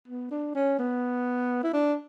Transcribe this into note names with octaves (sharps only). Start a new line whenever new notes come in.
B3
D4
C#4
B3
E4
D4